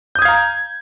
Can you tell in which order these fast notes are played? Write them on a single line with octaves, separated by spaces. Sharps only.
G6 D#6 G#6 F5 A#5